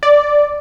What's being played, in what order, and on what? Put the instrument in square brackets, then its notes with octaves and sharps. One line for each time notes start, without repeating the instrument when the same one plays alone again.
[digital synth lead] D5